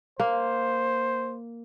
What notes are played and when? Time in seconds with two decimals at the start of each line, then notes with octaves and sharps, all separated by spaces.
0.20 A#3 C5